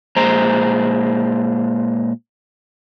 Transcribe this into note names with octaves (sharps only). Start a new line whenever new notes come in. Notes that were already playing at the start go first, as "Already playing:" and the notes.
A#2 G#3 C5 A#5